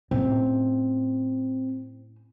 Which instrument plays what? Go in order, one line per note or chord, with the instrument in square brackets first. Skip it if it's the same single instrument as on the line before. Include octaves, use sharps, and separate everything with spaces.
[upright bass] A2 C#4 [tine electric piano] C4